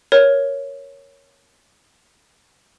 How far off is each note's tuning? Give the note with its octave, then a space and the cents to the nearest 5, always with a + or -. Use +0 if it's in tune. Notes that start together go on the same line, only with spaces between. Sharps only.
A#4 +5 C#5 +0